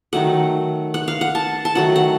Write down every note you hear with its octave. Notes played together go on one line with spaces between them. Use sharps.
D#3 F#3 A3 F#5
F#5
F5
F#5
A5
A5
D#3 F#3 A3 F#5
F#5